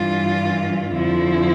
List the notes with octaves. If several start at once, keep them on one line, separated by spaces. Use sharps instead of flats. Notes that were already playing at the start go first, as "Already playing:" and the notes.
Already playing: G2 E3 G3 F4
F2 D3 F3 E4